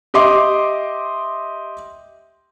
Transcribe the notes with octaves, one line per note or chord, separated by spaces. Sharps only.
G4 D#5 E5 C6 D6